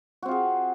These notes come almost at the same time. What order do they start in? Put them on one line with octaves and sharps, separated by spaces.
F#4 C4 F4 G#4